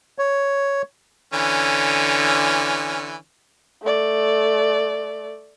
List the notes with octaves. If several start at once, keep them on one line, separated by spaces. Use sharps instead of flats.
C#5
D3 E3 C#4
A3 D5